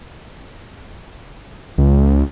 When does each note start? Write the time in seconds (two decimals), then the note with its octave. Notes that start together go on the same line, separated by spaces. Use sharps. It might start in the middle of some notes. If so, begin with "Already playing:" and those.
1.78 C#2